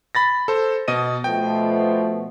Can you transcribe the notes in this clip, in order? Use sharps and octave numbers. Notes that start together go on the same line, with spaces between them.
B5 A6 A#6
A4 C5
B2 D#5 D#7
B2 F3 A3 G5